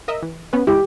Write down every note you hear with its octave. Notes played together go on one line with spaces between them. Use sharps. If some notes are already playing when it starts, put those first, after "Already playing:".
A#4 D#5 E5
E3
B3 C#4 B4
G#3 E4 G4